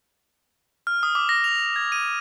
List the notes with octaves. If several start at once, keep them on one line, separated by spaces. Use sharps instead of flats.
F6
D#6
D6
A#6
F7
G#6
D#7